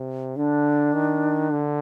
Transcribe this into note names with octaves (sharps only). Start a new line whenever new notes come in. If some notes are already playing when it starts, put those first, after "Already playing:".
Already playing: C3
D3 D4
D#3
D3